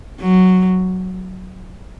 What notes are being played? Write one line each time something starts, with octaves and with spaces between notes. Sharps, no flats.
F#3